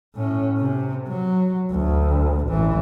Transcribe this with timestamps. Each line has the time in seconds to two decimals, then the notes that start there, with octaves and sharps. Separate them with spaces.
0.15 A2 C#4
0.58 C3
1.08 F#3
1.70 D2
2.48 A1 E3